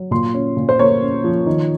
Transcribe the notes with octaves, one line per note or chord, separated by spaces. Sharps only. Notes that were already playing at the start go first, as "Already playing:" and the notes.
Already playing: F#3
A#2 C6
C#4
A#2
C5
A#3 C#5
C#4
F3
D#3